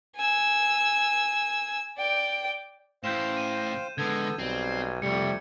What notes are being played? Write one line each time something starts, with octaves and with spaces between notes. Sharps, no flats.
G#5 E6
D5 G5
A2 E3 C5 F5 G5 G6 E7
D#7
D3 G#3 B3 A4 G#6
B1 G3 C4
C2 F2 C3 G3 A3 C#7